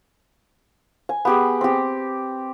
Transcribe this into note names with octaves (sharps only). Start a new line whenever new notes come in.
G#5
B3 G4 G#4
C4 G4